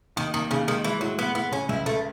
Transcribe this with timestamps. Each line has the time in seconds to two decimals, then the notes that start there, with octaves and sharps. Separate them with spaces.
0.16 D#2 D#3
0.33 D#2 D#3
0.50 D#2 C#3
0.68 D#3 G#3
0.84 E3 G#3
1.01 A2 F#3
1.19 G#3 B3
1.35 A2 B3
1.52 C#3 C#4
1.69 C#2 E4
1.85 C#2 A3